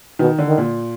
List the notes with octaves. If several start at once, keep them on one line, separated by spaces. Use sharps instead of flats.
B2 D#3
D3
D#3
A#2